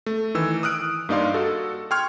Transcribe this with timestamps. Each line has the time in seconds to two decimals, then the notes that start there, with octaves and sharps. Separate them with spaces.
0.06 A3
0.35 D#3 E3 E6
0.63 D#6 F6 F#6 D7
1.09 G2 A#3 D#4 D5 F5 C6
1.34 F#4 A4
1.91 G5 C6 C#6 F6 G#6